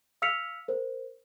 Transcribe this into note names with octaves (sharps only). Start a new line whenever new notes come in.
F5 E6 F6 B6 C#7 F7
A#4 C5